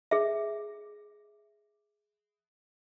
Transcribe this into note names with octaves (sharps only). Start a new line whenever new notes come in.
G#4 E5